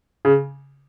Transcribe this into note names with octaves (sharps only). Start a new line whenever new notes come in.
C#3